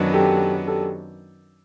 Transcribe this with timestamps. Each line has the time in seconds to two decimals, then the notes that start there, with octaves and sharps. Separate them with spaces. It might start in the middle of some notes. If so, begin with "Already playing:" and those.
Already playing: F#2 D#3 F#3 B3 D4
0.14 G4 A4
0.67 G4 A4